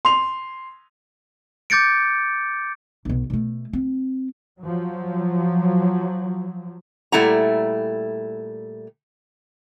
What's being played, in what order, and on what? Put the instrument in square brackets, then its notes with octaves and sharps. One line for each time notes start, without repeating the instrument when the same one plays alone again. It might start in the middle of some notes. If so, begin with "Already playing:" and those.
[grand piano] C6 F7
[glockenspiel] D6 G6 A6 C#7 D7
[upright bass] B1 B2
B2 A3
C4
[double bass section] F3 F#3
[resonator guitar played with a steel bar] A#2 G3 A3 E4 F#5 A#5